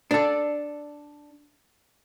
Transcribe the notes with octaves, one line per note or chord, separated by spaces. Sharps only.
D4 A4